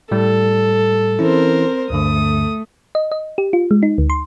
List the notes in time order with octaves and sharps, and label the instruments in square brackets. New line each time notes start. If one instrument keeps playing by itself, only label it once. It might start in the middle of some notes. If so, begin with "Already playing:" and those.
[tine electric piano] A2 G3 [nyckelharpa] A4
[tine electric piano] E3 C#4 E4 [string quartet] C4 A#4 C5
[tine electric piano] D2 G2 D3 [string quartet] A3 [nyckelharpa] D#6
[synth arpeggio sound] D#5
D#5
G4
F4
G#3
D#4
D2
C6